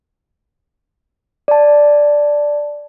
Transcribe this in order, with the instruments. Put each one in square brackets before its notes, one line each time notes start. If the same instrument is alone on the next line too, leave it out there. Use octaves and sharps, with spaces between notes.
[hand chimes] D5 A5